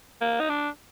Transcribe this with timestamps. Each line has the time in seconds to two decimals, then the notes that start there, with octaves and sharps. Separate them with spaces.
0.21 A#3
0.40 D#4
0.49 D4